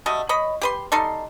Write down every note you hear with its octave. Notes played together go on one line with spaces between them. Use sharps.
G3 A3 F#4 D#5
C#5 D#5 B5
G4 B4 C6
G3 D#4 A4 C6